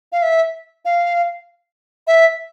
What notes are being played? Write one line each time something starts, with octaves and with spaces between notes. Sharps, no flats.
F5
E5
F5
E5